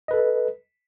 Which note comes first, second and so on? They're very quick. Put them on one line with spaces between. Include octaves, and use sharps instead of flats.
D#5 B4 A4